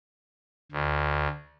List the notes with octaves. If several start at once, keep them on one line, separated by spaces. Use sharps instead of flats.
D2